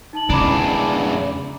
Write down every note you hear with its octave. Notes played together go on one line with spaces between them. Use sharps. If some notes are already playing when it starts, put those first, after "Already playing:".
D#4 A5 F#7
E2 C#3 D4 A#5 B5 D6